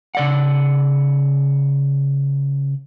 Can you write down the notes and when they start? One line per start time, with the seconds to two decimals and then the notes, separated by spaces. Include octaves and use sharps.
0.15 C#3 D5 F#5